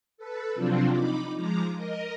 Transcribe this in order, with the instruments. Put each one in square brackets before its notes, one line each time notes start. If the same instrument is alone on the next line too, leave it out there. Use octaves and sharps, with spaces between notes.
[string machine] A4 B4
C3 F3 F#3 C4 D4 F4
D#4 B5 D6
F3 G#3 A#5 D6
A#4 D#5